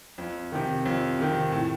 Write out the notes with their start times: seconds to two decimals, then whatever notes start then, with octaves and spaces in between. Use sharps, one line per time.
0.18 F2
0.52 C3 D#3
0.85 F2
1.19 C3 D#3
1.52 A2